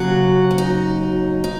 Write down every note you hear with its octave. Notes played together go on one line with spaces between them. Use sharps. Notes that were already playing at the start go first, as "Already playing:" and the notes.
Already playing: D#2 C#3 F#3 F#4
C#4
D#4
D#4